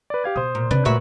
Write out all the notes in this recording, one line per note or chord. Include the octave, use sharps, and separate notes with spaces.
B4 D5
G4 F5 G#6
B2 C5 D#6
A#2
C3 D4 B4
A#2 A3 F#4 E5